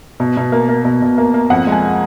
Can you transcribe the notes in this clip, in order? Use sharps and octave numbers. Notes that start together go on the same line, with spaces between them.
B2
B2
A#3
A#3
B2
B2
A#3
A#3
F2 F#5
G#3
G#5